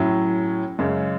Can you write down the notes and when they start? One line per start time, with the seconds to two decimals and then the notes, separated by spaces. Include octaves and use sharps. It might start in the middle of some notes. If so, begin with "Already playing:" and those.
Already playing: A2 F#3 C#4 E4
0.79 F#2 C#3 G#3